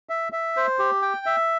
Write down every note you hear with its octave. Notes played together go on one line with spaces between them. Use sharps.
E5
E5
C5
G4
G5
E5